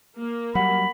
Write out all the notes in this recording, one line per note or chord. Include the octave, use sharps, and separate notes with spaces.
A#3
F#3 G3 F#5 B5